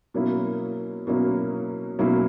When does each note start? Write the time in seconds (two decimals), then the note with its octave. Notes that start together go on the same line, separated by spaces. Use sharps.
0.14 B2 F#3 A#3 C#4 E4
1.07 B2 F#3 A#3 C#4 E4
1.99 B2 F#3 A#3 C#4 E4